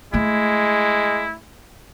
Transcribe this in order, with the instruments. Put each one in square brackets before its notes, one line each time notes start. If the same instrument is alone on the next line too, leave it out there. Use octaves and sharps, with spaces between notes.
[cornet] G#3 [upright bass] A3 [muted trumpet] E4